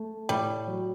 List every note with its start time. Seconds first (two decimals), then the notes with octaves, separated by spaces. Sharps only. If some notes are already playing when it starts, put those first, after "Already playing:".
Already playing: A3
0.29 A2 G3
0.67 F#3